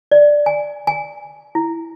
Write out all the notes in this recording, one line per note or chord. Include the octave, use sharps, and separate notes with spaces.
D5
G#5
G#5
E4